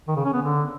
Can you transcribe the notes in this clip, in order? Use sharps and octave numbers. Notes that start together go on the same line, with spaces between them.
D#3
C#3
C#4
B3
D3